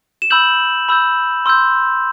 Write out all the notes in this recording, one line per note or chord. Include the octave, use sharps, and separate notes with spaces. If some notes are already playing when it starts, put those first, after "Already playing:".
E7
B5 E6 G6 F#7
B5 E6 G6
C6 E6 G6